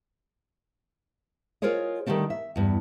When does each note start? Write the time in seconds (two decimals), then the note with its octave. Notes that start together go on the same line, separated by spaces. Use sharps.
1.62 F4 G#4 A#4 C5 C#5 D#5
2.06 D3 D#3 F3 G3 A3 C4
2.30 E5
2.56 E2 G2